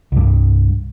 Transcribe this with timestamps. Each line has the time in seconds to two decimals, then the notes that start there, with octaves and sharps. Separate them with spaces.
0.12 C2 G2